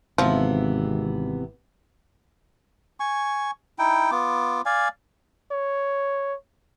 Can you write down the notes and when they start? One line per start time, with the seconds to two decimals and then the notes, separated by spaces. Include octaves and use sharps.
0.18 G#1 C3 E3 F3 B3
3.00 G#5 C#6
3.79 D#4 E4 G5
4.11 B3 F4 D6
4.66 D5 F5 G#5
5.51 C#5